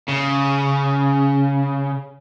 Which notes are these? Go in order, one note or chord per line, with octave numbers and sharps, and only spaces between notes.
C#3